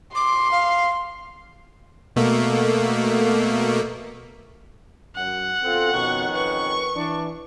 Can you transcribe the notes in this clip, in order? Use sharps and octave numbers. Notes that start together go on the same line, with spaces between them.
C6 D6
F5
B2 A3 A#3
F#2 F#5
B2 C4 F4 A4
F2 B2 D#3 C#4 C#6
B4 C#6
E3 D4